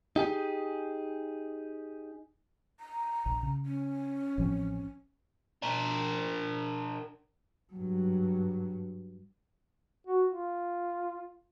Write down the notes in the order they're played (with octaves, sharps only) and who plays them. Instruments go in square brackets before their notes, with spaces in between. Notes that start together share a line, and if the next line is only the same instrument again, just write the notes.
[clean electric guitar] D#4 G4 G#4
[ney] A#5
[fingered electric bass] A#1
C#3
[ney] C#4
[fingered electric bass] A1 F3 C4
[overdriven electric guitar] D4 A#4
[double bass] G2 F#3
[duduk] F#4
F4